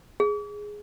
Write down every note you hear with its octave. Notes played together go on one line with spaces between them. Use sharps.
G#4